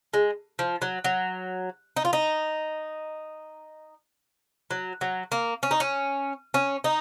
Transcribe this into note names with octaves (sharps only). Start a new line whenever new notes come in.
G#3
F3
F#3
F#3
D#4
F4
D#4
F#3
F#3
A#3
C#4
D#4
C#4
C#4
D#4